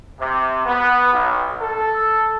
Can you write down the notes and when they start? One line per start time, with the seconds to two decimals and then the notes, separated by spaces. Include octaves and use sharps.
0.20 C3
0.66 B3
1.13 B1
1.62 A4